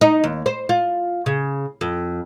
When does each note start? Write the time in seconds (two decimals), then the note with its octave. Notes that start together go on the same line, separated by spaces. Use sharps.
0.01 D#4
0.24 D#2
0.46 C5
0.69 F4
1.26 C#3
1.81 F2